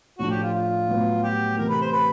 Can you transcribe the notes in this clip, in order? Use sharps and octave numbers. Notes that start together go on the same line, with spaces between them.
A2 F3 A3 D4 F#4
G4
F4
F4
A2 F#3 B3
G4
C3 E3 A3 A#4
B4
C5
B4